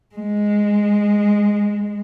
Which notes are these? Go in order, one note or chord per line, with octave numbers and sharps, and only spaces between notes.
G#3